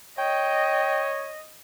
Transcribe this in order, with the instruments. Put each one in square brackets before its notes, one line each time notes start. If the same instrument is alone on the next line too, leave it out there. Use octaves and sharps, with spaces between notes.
[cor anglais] C#5 [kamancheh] D#5 [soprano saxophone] G5